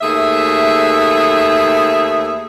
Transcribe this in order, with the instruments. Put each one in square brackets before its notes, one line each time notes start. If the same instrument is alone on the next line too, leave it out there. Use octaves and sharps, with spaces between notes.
[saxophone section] D#2 A3 G#4 E5